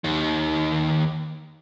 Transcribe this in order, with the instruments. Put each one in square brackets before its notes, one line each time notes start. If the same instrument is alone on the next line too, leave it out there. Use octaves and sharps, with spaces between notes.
[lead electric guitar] D#2 D#3